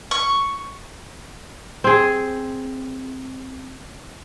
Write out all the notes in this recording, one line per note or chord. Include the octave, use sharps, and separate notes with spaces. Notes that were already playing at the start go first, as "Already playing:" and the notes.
C#6
C4 G#4